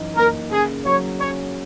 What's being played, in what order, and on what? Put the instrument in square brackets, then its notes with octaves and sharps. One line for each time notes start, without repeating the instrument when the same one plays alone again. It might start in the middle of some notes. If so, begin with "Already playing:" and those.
Already playing: [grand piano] F#2 E3 D#4
[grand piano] A#3 [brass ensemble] A#4
[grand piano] C#3 [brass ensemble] G#4
[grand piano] F#3 [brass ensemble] C#5
[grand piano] C#4 [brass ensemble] C#5